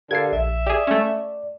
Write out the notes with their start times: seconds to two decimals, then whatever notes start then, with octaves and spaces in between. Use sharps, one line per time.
0.11 D3 G4 A#4 F5 G#6 C7
0.32 A#1 E5
0.66 G4 G#4 D5
0.87 A3 C#4